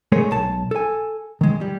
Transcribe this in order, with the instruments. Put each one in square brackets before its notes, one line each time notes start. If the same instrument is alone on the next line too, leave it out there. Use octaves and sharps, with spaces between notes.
[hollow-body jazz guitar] G#3 A3 G#4 A#4 C#5
B1 A5
A4 G#5
D#3 G#3
G3